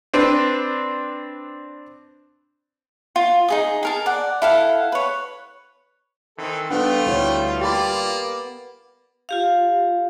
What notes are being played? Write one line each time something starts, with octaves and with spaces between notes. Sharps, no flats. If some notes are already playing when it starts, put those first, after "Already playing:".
C4 D4 B4
F4
D#4 G#4 D#6
G#4 A#4 A5
D5 F#5
E4 A4 F5 F#5
B4 C#5
D#3 E3 C4 A4
G3 A3 B3 D4 F4 A4 G5
D2 E4 C#5
A#3 G4 D5 A5 B5
F4 G4 F5